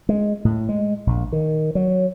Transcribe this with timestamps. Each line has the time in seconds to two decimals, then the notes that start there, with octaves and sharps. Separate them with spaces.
0.09 G#3
0.45 A2
0.69 G#3
1.07 A#1
1.32 D#3
1.75 F#3